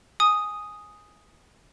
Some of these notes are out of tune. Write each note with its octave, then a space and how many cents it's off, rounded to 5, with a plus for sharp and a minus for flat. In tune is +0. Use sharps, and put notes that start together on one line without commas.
G#5 +0 D#6 +0